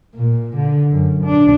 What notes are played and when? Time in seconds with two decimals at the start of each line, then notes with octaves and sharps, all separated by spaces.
0.15 A#2
0.56 D3
0.91 F#2
1.24 D4